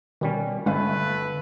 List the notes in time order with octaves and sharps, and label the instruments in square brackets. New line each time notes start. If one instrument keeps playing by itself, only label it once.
[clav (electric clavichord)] B2 G3 C#4 [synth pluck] D#3
[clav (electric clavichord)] G1 [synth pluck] G#3 C#4 F5 [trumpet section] A3 B4